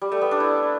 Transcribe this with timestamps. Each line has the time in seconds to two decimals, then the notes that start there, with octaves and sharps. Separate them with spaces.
0.02 G3
0.12 A3
0.21 B3
0.31 D4
0.40 E4